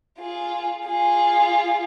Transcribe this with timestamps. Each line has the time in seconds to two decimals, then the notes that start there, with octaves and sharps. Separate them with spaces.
0.19 F4 G#4
0.87 F4 G#4